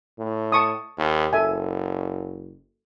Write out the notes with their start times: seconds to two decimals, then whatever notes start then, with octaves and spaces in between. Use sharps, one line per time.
0.19 A2
0.52 A5 C#6 D#6
0.98 D#2
1.33 F#1 A4 E5 G#5